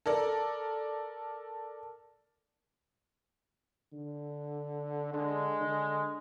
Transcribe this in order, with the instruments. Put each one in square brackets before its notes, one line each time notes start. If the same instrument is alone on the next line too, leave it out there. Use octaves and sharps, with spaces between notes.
[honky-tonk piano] A4 A#4 D5
[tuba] D3
[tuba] D3 [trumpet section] G#3
[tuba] D3